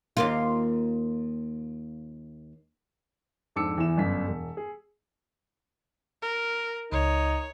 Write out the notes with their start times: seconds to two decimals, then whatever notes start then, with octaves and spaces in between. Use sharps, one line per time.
0.17 D#2 A#3 F4
3.56 F2 G#2 D4 D6 E6 C#7
3.77 E2 E3 E4 E7
3.97 G1 F#2 B6
4.27 E1
4.57 G#4
6.22 A#4
6.92 C#2 D#4 C#5